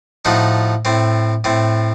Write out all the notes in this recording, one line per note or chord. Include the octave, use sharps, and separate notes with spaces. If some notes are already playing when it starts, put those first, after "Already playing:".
A2 F3 A3 D#4 F#4
A2 A3 C4
A2 A3 C4